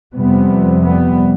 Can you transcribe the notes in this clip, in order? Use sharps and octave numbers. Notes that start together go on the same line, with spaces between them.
F2 C3 G3 B3
G3 B3